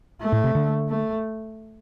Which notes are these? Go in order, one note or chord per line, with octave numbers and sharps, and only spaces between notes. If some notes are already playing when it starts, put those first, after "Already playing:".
A3
A2
C3
D3
A3